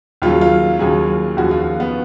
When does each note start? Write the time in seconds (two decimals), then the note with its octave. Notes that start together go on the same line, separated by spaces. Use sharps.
0.22 D#2 C#3 F#3 F4
0.41 F4
0.79 D#2 C#3 F#3 G#4
1.37 D#2 C#3 F3 F#4
1.51 F4
1.80 B3